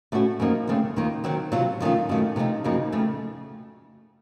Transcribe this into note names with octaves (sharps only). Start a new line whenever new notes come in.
A2 A3 C#4 F#4
F#2 F3 A#3 D#4
D#2 C#3 A3 C4
D#2 D#3 A#3 F4
D#3 F#3 C4
C3 F#3 C4 F4
F2 D#3 A3 C#4 F4
F#2 D#3 A3 C#4
C3 F3 A3 D#4
F#2 C#3 F3 A#3 D#4
F2 C#3 A3